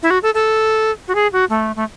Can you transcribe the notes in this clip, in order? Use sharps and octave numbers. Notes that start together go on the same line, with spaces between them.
E4
F#4
A4
A4
F#4
G#4
F#4
A3
A3